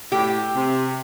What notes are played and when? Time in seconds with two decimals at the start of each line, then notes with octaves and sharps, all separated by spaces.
0.12 A2 G4
0.55 C3